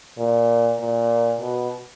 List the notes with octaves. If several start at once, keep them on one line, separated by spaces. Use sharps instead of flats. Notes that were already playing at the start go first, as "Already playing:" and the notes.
A#2
A#2
B2